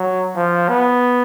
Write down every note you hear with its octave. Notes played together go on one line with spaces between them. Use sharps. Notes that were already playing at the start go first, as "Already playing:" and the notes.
Already playing: F#3
F3
B3